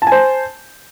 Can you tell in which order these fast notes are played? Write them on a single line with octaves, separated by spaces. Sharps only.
A5 G#5 C5